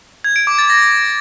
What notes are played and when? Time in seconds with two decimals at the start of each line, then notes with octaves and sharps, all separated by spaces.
0.24 G#6
0.36 D7
0.47 D6
0.58 A6
0.70 A#6